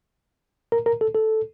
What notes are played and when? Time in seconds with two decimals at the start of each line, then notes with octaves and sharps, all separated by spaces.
0.72 A#4
0.86 A#4
1.01 A4
1.15 A4